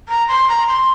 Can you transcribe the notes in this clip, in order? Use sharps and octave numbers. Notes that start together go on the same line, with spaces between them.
A#5
C6
A#5
C6